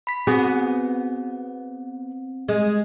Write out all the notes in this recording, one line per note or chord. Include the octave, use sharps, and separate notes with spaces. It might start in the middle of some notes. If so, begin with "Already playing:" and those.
B5 B6
B3 C4 F#4 G#4
G#3